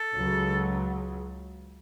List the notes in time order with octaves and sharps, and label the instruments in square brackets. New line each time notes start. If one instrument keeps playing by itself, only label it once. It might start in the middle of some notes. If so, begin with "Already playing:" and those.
Already playing: [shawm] A4
[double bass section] C#2 C#3 F#3